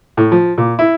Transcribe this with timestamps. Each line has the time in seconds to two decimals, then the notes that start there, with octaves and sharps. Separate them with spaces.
0.17 A2
0.32 F3
0.58 A#2
0.79 E4